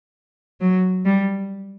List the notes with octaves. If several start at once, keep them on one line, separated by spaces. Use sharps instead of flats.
F#3
G3